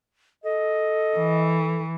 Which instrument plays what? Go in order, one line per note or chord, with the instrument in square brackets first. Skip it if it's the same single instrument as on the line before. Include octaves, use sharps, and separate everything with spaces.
[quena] A4 [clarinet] D#5
[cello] E3